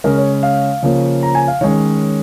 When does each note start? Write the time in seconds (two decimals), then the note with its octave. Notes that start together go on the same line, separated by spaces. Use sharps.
0.04 C#3 G#3 C#4 A#4
0.18 C#5
0.43 F5
0.83 C#3 F3 A#3 C#4
1.23 A#5
1.35 G#5
1.48 F5
1.61 D#3 G#3 C#4 C#5